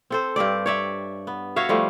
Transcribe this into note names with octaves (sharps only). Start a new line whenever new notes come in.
C4 A4 C5
G2 C4 G4 D5
C#5 D5 E5
B3
F#4 C#5 E5 F5
F3 G3 A3